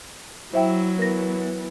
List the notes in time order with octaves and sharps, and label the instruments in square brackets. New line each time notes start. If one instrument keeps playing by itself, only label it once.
[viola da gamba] F#3 [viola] E4 [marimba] C5 E5 G5
[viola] E3 B3 [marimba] A#4 A#6